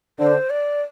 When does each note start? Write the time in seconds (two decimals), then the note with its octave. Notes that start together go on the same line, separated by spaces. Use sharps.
0.19 D3 C5
0.50 D5